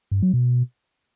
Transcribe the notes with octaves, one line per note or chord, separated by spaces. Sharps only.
G2
F#3
B2